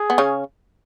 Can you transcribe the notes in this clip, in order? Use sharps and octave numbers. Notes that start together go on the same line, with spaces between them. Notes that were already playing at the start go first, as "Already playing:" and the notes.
Already playing: G#4
B3
C#3 C#4